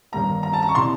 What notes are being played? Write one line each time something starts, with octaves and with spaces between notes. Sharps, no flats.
G1 G2 D#3 G3 A#3 A#5
A#5
A5
A#5
C#6
C3 E3 C6